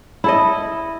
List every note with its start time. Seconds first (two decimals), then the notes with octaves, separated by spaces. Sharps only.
0.24 E4 A4 D#5